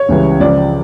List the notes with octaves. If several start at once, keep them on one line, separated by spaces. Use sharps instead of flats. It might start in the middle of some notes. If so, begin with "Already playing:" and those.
Already playing: C#5
C#2 C#3 E3 G3
C#2 C#3 F3 D5